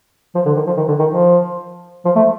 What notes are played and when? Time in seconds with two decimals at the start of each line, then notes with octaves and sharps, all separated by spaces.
0.35 F3
0.46 D3
0.56 D#3
0.67 F3
0.77 D#3
0.88 D3
0.99 D#3
1.09 F3
2.05 F3
2.16 A3